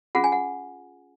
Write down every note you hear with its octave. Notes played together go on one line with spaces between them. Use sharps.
C#4 F4 G#4 F#5
G#5
F#5